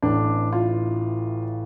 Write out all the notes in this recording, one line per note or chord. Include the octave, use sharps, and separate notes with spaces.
A1 A2 E3 D4
F4